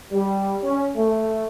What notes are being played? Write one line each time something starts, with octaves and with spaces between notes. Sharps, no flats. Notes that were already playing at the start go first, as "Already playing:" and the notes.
G3
C#4
A3